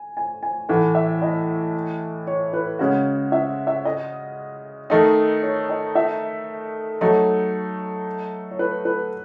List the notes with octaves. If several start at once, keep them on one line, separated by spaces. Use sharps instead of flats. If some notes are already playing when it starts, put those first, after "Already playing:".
Already playing: G#5
G#5
G#5
A2 E3 A3 F#5
E5
D#5
C#5
B4
C#3 G#3 C#4 F#4 C#5
E5
E5
D#5
D#3 A3 D#4 D#5
C#5
D#5
E5
F#3 A3 D#4 C#5
C#5
B4
B4